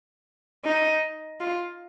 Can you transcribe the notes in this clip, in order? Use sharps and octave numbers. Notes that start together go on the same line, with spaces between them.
D#4
F4